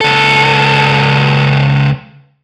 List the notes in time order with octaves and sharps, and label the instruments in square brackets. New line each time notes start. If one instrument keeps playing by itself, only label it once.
[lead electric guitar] C#2 A4